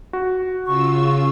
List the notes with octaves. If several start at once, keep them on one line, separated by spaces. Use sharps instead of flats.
F#4
C#3 F4 C#6 E6